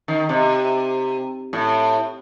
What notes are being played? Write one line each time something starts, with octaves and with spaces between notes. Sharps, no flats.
D#3
C3
A2